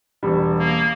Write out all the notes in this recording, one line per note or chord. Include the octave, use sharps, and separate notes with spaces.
E1 G3
A#3